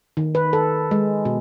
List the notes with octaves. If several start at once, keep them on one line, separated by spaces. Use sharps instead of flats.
D#3
B4
A4
G#3
B2